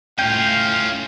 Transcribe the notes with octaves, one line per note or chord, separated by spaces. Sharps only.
A2 C#4 F4 F5 G5